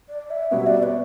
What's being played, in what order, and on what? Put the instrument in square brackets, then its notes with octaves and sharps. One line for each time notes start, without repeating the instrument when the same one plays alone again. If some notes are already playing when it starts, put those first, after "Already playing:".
[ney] D5
E5
[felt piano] B2 G3 B3 F#4 [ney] E5
[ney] D5
B4